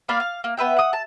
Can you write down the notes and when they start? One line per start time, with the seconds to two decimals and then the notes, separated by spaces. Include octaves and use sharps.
0.08 A#3 D5 F5 B5
0.20 F5
0.44 A#3
0.57 B3 B4 E5 G5
0.76 F#5 D#6
0.93 A5